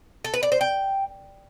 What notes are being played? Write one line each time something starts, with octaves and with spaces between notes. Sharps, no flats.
A4
B4
D5
C5
G5